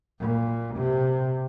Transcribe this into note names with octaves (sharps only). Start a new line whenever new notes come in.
A#2
C3